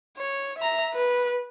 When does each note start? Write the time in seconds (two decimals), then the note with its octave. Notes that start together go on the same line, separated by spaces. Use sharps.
0.17 C#5
0.58 E5 A#5
0.93 B4